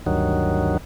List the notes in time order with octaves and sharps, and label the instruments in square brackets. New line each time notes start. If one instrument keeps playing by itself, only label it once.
[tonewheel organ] D2 G2 D#3 F#3